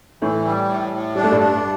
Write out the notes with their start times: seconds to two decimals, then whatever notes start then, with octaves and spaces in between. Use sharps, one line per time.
0.22 A2 E3 A3
0.45 G3
0.69 A2
0.93 A2
1.15 G3 D4
1.24 A3
1.32 G2 G3
1.40 D4